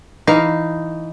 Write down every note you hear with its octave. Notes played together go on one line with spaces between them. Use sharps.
E3 D#4 F5